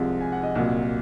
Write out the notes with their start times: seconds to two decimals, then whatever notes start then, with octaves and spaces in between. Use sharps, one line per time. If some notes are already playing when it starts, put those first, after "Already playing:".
Already playing: C2 C3 F3 G#3
0.21 G#5
0.32 F#5
0.43 D#5
0.55 C2 A#2 F#3